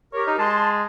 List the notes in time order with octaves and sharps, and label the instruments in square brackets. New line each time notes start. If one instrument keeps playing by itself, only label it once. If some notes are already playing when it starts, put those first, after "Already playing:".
[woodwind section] G4 A#4 [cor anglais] C#5
[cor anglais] D#4
[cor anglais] G#3 [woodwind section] A5 C6